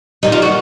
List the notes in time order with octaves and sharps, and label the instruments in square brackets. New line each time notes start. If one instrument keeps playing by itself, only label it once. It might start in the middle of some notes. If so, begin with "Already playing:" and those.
[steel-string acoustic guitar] D#2 D#3 G3 [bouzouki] D#4
[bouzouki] F4
F#4